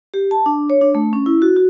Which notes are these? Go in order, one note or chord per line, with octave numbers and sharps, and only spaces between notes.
G4
A5
D4
C#5
D4
A3
C#4
E4
F#4
F#4